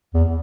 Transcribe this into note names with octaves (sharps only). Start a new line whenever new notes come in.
E2